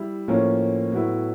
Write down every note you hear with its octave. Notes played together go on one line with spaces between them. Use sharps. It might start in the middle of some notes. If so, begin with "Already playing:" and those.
Already playing: G3 E4
A2 F3 A#3 C#4
A2 F#3 B3 E4